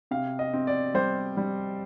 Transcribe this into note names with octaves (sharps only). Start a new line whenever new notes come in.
C3 F5
D#5
C4
D5
G3 C5
G3